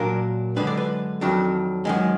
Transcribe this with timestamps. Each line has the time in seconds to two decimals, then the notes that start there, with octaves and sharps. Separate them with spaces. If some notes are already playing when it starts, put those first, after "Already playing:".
Already playing: A#2 F#3 D4 A#4
0.56 F#2 D3 G#3 D4 B4
0.67 D5
0.77 B4
1.21 F2 D#3 F#3 D4
1.85 F#2 D#3 G#3